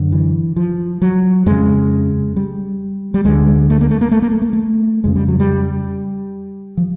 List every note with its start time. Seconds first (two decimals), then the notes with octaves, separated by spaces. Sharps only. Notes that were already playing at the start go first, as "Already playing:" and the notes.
Already playing: F#2 D3
0.12 E3
0.56 F3
1.02 F#3
1.46 F2 C#3 G#3
2.36 G3
3.14 G3
3.25 D2 D3 G#3
3.70 A3
3.81 A#3
3.91 A3
4.01 A#3
4.11 A3
4.22 A#3
4.31 A3
4.42 A#3
4.53 A3
5.04 F2 C#3 G#3
5.16 G3
5.28 F#3
5.40 G3
6.77 F3